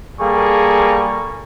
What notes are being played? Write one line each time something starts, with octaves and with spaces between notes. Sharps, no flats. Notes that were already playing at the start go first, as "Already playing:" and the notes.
G3 A#3 G#4 A4 C#6